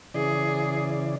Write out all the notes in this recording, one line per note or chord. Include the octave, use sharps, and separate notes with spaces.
C#3 E3 G#4 D5